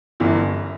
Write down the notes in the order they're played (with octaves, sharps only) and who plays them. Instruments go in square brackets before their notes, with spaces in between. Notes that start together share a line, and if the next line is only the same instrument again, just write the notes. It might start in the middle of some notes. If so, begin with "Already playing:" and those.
[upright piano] G1 F#2 E3